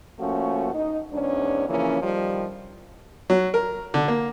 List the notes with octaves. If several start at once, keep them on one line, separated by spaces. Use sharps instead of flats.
F3 A3 A#3 C#4 F#4
D#4
E2 G#2 C#4 D4
C#3 E3 F3 A#3 C#4
D#3 F3 G3
F#3
A#4
D3
A#3